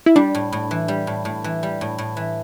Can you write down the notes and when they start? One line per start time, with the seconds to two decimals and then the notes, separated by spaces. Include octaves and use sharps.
0.06 E4
0.16 G3 D4
0.35 A2
0.52 A2
0.71 E3
0.88 G3
1.07 A2
1.25 A2
1.44 E3
1.63 G3
1.81 A2
1.98 A2
2.17 E3